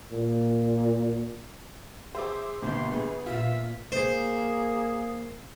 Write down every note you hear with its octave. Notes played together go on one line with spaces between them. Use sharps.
A#2
G#4 C5 E5 D6
G1 B2 A#3 G4 C6
B3 G#4
A#2 F4 E5
A#3 G#4 C5